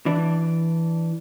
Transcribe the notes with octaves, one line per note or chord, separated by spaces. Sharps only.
E3 D4